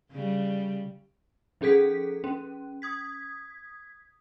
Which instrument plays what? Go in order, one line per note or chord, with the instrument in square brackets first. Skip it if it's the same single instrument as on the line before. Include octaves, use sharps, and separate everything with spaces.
[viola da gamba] C#3 G3
[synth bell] F3 C#4 G#4 A4 B6
C#4
D#6 G#6 B6